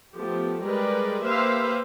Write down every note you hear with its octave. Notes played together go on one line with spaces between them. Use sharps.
F3 A3 B3 G4
G3 G#3 G4 A#4 B4 D5
A#3 G4 B4 C5 E5 F5